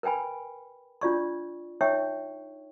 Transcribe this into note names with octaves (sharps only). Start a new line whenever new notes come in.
A#4 B4 G5 G#5 B5
D4 F4 D5 C#6
D#4 C#5 E5 G5 C#6